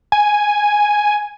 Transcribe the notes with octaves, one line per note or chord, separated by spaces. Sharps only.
G#5